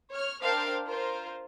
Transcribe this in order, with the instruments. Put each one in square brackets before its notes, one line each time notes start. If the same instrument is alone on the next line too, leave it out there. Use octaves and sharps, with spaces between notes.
[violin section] C#5 F6
D4 A#4 C5 F5 G5 A5
F4 A#4 C5